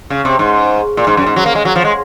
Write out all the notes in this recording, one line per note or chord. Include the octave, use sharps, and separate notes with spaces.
C#3
C3
G#2
A#2
G#2
F#2
G#2
F#3
A#3
G#3
F#3
F3
G#3